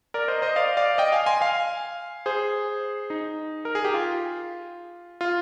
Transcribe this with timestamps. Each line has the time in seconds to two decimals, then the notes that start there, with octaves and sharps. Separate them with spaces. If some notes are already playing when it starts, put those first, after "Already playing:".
0.14 A#4 D5
0.28 C5 D#5
0.42 C5 D#5
0.56 D5 F5
0.77 D5 F5
0.98 D#5 G5
1.12 F5 G#5
1.26 G#5 C6
1.41 F5 G#5
2.26 G#4 C5
3.10 D#4
3.65 A#4
3.75 G#4
3.85 G4
3.94 F4
5.21 F4